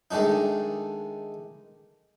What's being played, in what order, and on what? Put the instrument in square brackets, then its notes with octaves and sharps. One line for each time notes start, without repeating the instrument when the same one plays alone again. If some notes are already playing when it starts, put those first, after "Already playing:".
[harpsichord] D#3 G#3 A3 D4 D#4